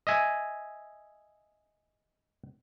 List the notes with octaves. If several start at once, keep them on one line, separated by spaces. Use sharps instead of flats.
D#5 E5 G#5